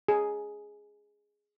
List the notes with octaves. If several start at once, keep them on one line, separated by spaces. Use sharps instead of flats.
G#4